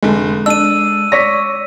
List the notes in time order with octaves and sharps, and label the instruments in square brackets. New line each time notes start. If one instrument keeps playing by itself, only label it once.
[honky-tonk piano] F1 D3 [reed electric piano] G#3
[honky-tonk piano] D4 [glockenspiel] E6 D#7
[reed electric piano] C#5 [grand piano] D5 C#6 B6 [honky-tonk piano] A#6